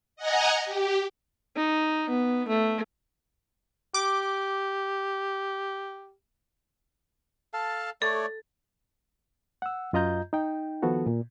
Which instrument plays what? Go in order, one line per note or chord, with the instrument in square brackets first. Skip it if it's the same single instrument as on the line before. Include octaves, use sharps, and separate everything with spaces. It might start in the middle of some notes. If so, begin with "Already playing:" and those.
[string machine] D#5 F#5 G#5 A#5
G4
[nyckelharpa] D#4
B3
A3
[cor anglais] G4 [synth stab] D6
[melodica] A4 F5 A5
[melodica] A3 C#5 D5 [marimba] A4
[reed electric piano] F#5 E6
F#2 F4 D#5 A#5 G6
D#4 G5
D#3 F3 B3 F#4 A4
A#2